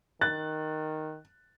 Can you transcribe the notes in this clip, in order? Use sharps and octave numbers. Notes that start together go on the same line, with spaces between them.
D#3 F#6 A6